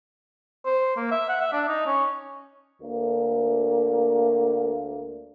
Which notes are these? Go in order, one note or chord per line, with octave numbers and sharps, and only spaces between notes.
C5
A#3
E5
F#5
E5
D4
D#4
C#4
D2 A#3